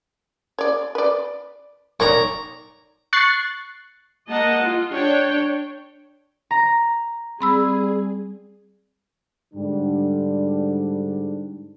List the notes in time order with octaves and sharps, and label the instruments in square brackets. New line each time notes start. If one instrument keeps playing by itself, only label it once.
[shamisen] C#5 D5
B4 D5
[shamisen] D#3 C#5 D5 [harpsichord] A#5 C#6
[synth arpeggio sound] C#6 F#6 A6 C7
[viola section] A#3 D#5 F#5 A5
F4
D4 C#5 G5
[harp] A#5
[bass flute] G3 [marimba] C4 B5 E6 [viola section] G#4
[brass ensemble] G#2 D3 G3 D4